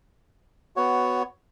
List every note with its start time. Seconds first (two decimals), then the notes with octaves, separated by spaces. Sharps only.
0.76 B3 F#4 C#5